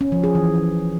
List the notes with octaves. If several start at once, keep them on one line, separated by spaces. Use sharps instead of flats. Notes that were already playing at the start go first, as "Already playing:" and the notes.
C#4
F3
G#4
E3